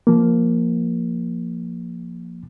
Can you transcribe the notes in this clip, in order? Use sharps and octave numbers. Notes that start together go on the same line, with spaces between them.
F3 A#3